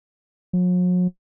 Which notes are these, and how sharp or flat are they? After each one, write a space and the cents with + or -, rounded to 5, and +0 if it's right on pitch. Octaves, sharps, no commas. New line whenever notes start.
F#3 -45